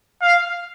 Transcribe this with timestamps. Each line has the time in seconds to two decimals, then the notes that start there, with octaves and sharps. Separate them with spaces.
0.21 F5